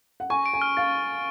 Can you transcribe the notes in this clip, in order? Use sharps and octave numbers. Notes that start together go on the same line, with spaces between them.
F#5
G#5 C#6
D7
G#5
F6
F5 A6